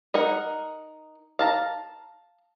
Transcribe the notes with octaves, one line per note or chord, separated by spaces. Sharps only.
D#4 A#4 F#5
F5 A5 A#5